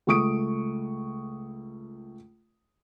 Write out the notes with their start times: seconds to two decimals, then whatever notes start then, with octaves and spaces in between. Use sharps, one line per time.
0.07 C#2 A3 C#6 D#6 D7